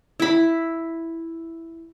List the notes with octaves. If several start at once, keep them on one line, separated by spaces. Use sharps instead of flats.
E4 B5